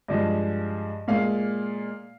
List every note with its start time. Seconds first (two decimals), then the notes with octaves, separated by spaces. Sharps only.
0.08 G2 F3 G#3 D#5
1.08 A#2 G#3 F5